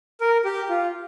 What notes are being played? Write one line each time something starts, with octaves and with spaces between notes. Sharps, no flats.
A#4
G4
F4